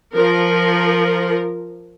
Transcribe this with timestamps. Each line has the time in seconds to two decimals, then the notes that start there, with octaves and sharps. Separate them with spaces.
0.14 F3 A#4